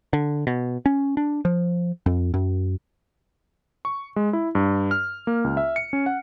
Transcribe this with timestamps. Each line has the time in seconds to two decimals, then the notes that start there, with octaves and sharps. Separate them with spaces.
0.13 D3
0.47 B2
0.86 C#4
1.17 D4
1.45 F3
2.06 F2
2.34 F#2
3.85 C#6
4.16 G#3
4.33 E4
4.55 G2
4.91 F6
5.27 A#3
5.44 C#2
5.57 E5
5.76 C#7
5.93 C#4
6.06 F#5